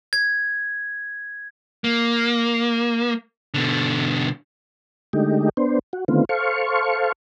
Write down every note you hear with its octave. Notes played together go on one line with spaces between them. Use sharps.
G#6
A#3
B2 D3
D3 G#3 A3 D#4 G4
B3 D4 C5
F#4
D3 D#3 A3 B3 C4 F4
A4 C5 F5 C#6